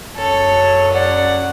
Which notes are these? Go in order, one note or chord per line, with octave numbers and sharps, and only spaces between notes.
F#2 C#3 F#3 A4 C#5
D5 F#5